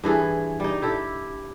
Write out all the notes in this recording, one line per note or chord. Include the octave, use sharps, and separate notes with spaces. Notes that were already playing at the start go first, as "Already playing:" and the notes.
G2 E3 G#4 A4
G3 D#4
E4 G4 A4